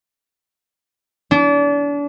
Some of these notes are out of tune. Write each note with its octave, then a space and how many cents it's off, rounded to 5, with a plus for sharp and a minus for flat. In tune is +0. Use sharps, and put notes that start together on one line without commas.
D4 -35